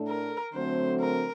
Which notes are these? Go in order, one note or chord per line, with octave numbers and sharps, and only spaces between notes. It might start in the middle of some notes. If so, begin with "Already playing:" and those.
Already playing: A2 A3 D4 A4
A#4
D3 F#3 A3 C4 C5
A#4